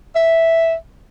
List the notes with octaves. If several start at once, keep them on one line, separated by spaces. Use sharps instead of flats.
E5